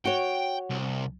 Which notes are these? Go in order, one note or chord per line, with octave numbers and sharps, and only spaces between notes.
F#4 C#5 G5
C2